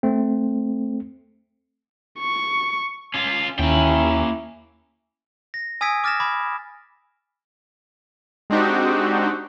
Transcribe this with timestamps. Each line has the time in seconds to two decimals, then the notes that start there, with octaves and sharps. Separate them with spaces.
0.03 A3 C4
2.19 C#6
3.14 C#4 F4
3.59 D#2 A#3 C#4 E4 G5
5.54 A#6
5.81 G#5 D#6 E6 G#6 B6 D7
6.04 D6 F6 A6 A#6 E7
6.20 B5 D6 G#6
8.50 G#3 C4 D4 D#4 F#4 G4